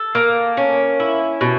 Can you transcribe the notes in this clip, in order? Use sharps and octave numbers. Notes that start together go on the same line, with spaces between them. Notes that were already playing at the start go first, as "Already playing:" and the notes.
Already playing: A4
A#3
C#4
E4
B2